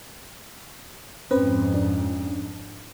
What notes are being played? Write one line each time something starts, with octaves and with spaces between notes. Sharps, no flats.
F2 G#2 C4 C#4 B4 C5
D4